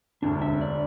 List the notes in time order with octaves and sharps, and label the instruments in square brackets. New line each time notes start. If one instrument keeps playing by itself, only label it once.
[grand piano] E1 D2 D3 [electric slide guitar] D4
[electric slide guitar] E5
D5